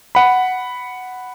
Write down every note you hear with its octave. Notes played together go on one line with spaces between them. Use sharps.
F#5 B5